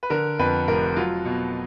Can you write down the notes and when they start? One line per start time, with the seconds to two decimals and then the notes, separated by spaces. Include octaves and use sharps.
0.03 B4
0.10 D3 A#4
0.39 F2 B4
0.68 F1 A#4
0.96 F#3 F4
1.25 B2